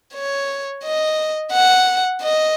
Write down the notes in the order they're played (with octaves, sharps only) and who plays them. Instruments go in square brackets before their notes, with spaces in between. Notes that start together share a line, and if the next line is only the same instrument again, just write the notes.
[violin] C#5
D#5
F#5
D#5